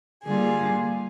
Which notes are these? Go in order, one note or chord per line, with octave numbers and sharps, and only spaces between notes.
D3 G3 A#3 F4 G#4